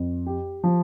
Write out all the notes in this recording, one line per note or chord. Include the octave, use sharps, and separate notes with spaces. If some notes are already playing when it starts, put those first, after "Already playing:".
Already playing: F2
G4
F3